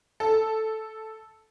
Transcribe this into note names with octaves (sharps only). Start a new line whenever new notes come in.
A4